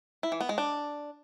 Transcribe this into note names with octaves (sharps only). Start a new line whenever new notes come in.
E4
E3
B3
G#3
D4